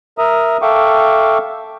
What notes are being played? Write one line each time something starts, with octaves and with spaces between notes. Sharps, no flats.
A#4 E5 A#5 D#6
A4 E5 F5 G5 C#6 D6